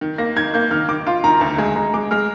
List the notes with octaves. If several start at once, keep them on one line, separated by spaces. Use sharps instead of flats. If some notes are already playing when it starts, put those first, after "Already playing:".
D#3
A#3 A#6
D#3 G#6
A#3 G6
D#3 F6
D#3 D6
F4 C6
D#3 A#5
D2 A#5
G#3 G#5
G#3 A#5
G#3 D6
G#3 F6